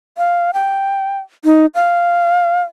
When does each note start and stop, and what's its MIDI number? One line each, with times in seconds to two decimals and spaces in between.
0.18 0.51 77
0.54 1.18 79
1.45 1.66 63
1.75 2.62 77